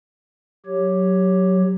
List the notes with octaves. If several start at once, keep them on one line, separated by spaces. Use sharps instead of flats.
F#3 G4 C#5